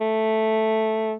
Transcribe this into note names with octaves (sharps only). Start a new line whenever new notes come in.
A3